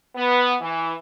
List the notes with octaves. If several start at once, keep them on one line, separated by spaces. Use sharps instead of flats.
B3
E3